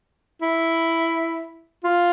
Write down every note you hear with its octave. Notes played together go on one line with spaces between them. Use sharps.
E4
F4